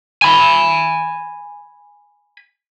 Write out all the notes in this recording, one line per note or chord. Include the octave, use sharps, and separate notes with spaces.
G#5 B5